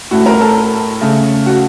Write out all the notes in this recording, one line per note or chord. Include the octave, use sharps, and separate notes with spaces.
A2 A3 F#4
A#4
A4
C#3 A3
F#4